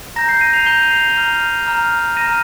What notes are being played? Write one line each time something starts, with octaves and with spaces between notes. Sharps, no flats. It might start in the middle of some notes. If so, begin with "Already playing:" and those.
A#5 G6 A#6
G6 C7
A#6 D#7
C7 F7
A#5 G6 D#7 G7
C7 F7
A#5 F6
A#5 F6
A#5 F6 A#6 D#7